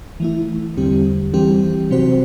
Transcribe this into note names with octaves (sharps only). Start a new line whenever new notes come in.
E3 A3 E4
E2 D3 G3 C4 G4
E3 G3 C4 G4
C3 F#3 C4 F#4 C5